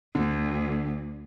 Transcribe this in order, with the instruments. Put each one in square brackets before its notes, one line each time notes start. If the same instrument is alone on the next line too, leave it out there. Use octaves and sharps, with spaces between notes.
[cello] D2 [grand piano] D3